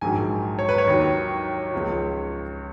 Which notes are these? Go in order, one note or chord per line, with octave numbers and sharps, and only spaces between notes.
A#1 G#2 D#3 F#3 G#5
C#5
B4
C#5
D#2 D#3 F#3
C#2 C#3 F3